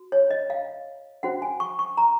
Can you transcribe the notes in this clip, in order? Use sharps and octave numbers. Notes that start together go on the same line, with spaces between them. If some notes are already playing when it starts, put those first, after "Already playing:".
Already playing: F#4
C#5
D#5
F5
C#4 F#4 C5 F#5
G#5
C#6
C#6
A#5